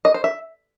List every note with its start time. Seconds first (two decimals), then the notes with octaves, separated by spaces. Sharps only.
0.05 D#5
0.14 C5
0.24 E5